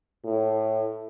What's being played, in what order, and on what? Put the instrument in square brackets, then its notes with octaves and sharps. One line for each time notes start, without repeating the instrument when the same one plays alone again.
[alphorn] A2